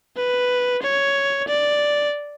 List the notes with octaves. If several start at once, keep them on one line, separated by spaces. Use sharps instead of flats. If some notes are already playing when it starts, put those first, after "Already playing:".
B4
C#5
D5